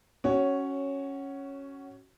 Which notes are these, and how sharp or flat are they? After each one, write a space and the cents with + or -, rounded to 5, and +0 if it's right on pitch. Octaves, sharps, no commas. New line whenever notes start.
C#4 -5 F#4 +15 C#5 +0